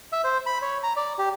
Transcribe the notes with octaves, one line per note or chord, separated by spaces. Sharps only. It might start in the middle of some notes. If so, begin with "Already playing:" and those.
E5
C5
B5
C#5
A#5
D5
G4